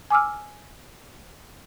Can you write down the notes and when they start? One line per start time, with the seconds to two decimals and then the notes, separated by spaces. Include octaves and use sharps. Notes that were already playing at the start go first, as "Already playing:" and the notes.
0.11 G#5 D6 E6 F6